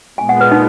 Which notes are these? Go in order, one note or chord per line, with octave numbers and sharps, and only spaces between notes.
A#2 G#3 B3 G#5
F#5
B4
D#4